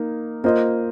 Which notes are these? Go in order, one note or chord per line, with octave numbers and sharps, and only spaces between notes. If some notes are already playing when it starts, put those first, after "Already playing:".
Already playing: A#3 D#4
A#3 F4 C5 D#5